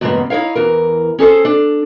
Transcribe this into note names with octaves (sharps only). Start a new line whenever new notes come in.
E2 G2 C#3 G#3 A#3 B3
D#4 E4 A#4 C#5 F5
E2 E3 A#4
C#4 G#4 A4 C5
D4